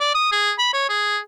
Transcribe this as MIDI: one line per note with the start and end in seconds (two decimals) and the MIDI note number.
0.01 0.13 74
0.15 0.30 87
0.32 0.52 68
0.58 0.68 83
0.73 0.88 73
0.89 1.18 68